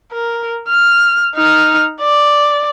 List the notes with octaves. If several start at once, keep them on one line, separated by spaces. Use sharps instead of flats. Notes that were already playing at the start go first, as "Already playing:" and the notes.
A#4
F6
D#4 F6
D5